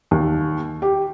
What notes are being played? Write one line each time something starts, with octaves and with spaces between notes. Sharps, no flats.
D#2
G4